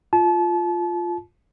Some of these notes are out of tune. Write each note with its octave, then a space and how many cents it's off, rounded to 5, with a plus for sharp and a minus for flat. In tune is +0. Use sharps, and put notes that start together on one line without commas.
F4 +0 A5 -35